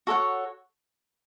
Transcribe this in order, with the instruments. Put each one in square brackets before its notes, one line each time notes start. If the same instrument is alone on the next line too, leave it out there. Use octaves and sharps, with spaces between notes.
[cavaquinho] F#4 A4 C#5 F#5